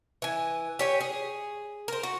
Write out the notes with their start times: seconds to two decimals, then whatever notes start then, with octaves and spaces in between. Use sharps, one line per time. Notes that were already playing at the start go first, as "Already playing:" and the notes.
0.22 E3 G#5
0.79 G4 C#5 G#5
1.00 G#4
1.88 A#4 C5
2.03 F#4